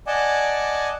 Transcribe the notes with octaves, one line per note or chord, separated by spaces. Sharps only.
D5 D#5 F#5 G#5 A5 D6